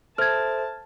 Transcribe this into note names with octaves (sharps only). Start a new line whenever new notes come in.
A4 C5 E5 A5 F6 G#6